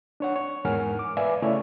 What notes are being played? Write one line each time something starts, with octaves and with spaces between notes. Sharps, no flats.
D4 C#5 F#5
C#5
E2 G#2 A#4 F#5 G#5 F6
D6
B4 D5 E5 F5 G#5 D6
C#3 A3 E4 C#5 D5